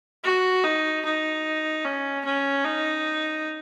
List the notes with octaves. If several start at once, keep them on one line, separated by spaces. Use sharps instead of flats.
F#4
D#4
D#4
C#4
C#4
D#4